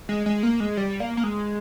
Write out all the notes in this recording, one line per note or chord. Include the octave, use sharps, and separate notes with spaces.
G#3
G#3
A#3
G#3
G3
A#3
A#3
G#3